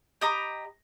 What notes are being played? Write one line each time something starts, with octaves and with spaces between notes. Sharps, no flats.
G4 D#5 A#5 B5